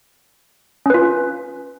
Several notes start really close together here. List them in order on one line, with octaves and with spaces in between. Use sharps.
C#4 B4 F4